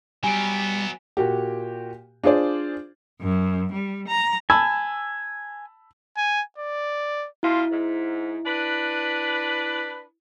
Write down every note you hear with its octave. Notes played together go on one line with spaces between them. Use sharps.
F#3 G3 B3 G#5 D7
A#2 F#4 G4
D4 F4 G#4 C5 D5
F#2
G3
A#5
G#5 A5 B5 E6
G#5
D5
B2 E4 F4
G#2
D4 B4